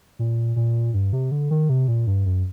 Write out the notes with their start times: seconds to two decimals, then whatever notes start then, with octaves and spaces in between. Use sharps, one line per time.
0.19 A#2
0.56 A#2
0.94 G2
1.13 C3
1.31 D3
1.51 D#3
1.69 C3
1.88 A#2
2.07 G2
2.26 F#2